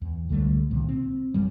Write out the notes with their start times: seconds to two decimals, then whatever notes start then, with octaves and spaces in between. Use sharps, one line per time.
0.02 E2
0.29 C#2 D3 G3 A3
0.71 C2 A#2 D#3
0.89 C4
1.34 A1 F#2 G3